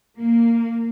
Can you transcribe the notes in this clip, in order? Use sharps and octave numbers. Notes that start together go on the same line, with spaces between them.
A#3